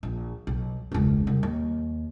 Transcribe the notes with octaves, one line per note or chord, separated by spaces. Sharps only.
A#1
B1
E1 C#2
C2
D#2